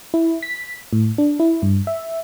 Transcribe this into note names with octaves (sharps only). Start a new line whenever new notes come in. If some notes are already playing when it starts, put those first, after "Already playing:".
E4
B6
A2
D4
E4
G2
E5